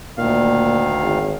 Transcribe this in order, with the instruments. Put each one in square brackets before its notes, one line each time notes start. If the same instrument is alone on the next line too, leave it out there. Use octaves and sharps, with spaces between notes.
[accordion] D2 D#3 F5 [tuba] A#2
[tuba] G#1